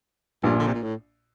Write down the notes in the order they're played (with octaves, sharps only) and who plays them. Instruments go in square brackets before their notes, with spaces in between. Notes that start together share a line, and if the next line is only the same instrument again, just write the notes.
[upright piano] A#1 A#2 [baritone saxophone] G2
[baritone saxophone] D3
C3
A#2
A2